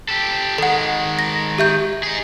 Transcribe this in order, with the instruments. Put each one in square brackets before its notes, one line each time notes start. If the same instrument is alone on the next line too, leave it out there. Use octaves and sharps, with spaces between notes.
[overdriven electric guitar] G4 A4
[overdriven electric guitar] D#3 G#3 [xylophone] A4 F#5
[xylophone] A#6
G4 E5 G6
[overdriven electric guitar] D#4 G#4